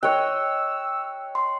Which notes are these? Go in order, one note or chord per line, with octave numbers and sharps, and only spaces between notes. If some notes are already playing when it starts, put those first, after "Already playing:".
C#5 D#5 G5 E6 F#6
C6